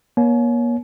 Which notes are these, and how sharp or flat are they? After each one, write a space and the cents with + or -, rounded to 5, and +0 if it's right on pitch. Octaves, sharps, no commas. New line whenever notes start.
A#3 +40 C#5 +15 G#5 +40